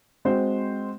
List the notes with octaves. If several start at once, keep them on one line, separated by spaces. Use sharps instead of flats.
G#3 C4 F#4 C5